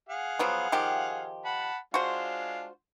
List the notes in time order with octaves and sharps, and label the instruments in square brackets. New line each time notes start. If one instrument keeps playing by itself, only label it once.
[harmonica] G#4 F5 F#5
[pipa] F3 F#3 B3
D#3 F3 G4
[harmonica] F#5 A5 B5
[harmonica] G#3 D4 F4 [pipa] F#4 C5